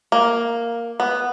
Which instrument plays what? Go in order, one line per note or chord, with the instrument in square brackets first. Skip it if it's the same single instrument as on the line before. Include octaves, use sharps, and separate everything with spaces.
[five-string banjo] A#3
B3